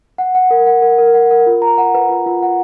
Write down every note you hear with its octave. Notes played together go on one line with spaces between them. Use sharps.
F#5
F#5
A#4
F#5
A#4
A#4
F#5
A#4
F4
A#5
F#5
B4
F4
F4
F#5